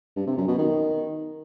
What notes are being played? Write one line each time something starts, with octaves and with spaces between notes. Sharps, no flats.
G2
C3
F#2
B2
D#3